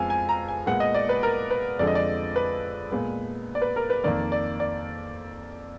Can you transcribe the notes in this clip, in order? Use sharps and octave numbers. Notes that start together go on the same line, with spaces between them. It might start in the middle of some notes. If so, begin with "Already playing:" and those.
Already playing: F2 F3 G#3 B3 F5 G#5
G#5
A#5
G#5
A#2 G#3 B3 F#5
D#5
D5
B4
A#4
B4
F2 D3 F3 G#3 D5
D#5
D5
B4
A#2 G#3 B3
D5
B4
A#4
B4
F2 D#3 A#3 D5
D5
D5